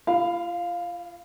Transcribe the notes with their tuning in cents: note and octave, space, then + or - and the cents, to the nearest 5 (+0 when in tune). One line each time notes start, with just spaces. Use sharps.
F4 -35 F5 +5 B5 +20